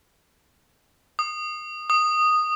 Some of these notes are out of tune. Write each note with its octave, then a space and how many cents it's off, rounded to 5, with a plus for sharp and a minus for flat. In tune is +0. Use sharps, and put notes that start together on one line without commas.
D#6 -20
D#6 -10